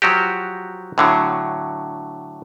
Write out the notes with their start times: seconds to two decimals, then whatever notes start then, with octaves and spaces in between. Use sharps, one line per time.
0.02 F3 F#3 F#4 G4
0.98 A2 D3 F#3